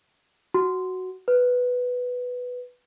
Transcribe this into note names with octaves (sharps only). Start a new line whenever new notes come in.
F#4
B4